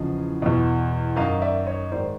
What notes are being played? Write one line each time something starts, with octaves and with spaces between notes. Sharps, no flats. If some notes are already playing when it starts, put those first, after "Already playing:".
Already playing: E2 C#3 F3 D#5
E2 B2
F#2 D#3 D#5 F5
D5 E5
C#5 D#5
G#2 D#3 C5 D5